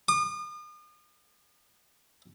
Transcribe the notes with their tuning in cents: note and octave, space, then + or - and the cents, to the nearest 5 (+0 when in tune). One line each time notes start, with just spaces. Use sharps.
D#6 -40